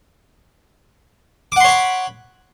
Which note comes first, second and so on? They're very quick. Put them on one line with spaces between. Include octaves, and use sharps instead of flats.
D6 F#5 C6 C#5 B5